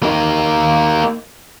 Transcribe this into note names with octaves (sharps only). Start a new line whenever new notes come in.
A#3 D#4